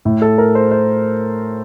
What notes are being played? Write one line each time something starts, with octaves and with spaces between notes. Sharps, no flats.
A2
A4
A#4
C5
C5